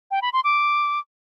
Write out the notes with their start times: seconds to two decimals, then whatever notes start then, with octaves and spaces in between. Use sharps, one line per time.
0.11 G5
0.22 B5
0.33 C6
0.44 D6